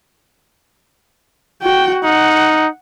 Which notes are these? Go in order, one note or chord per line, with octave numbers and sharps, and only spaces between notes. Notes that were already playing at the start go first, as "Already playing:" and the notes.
F#4 G5
D#4 F#5